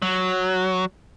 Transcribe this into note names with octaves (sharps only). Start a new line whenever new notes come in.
F#3